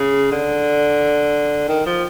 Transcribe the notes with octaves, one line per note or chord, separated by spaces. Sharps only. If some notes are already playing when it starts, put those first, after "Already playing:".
Already playing: C#3
D3
D#3
F3